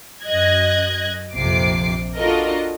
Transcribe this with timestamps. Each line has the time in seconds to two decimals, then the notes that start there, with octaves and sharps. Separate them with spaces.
0.24 F#2 D#5 F#6 G#6 A#6
1.36 A#1 F2 C3 D6 C7
2.17 D4 F4 F#4 A4 A#4 D#5